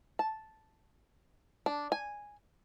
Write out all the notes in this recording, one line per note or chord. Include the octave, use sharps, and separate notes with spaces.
A5
D4
G#5